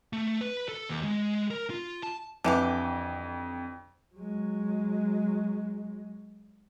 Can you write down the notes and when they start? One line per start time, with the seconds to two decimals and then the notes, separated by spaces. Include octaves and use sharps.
0.13 A3
0.41 B4
0.69 A4
0.89 D#2
1.03 G#3
1.51 A#4
1.70 F4
2.03 A5
2.44 F2 D3 E3 G4
4.15 F#3 G#3